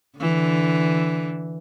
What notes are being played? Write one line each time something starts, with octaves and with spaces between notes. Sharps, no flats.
D3 E3